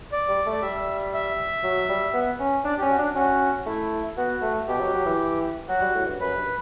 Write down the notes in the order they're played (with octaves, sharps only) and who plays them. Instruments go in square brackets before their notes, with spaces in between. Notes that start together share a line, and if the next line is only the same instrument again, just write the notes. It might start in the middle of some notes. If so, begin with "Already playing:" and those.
[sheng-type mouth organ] D5
[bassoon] G3
A3
[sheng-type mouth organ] D5
[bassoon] G3 [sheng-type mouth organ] E5
[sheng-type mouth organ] E5
[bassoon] F#3
G3
B3
C#4
[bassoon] D4 [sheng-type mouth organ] D5
[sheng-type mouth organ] G4
[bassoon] C#4
[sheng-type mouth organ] F#4
[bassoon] D4
[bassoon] C#4 [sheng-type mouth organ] F#4
[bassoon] A3 [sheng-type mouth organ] E4
[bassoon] B3 [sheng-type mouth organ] F#4
[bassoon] A3
[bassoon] B2 [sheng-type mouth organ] G4
[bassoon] F#3
F#3
E3
[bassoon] F#3 [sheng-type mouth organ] F#4
[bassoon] G3
A2
G2
[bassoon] F#2 [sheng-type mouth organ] B4
[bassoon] G2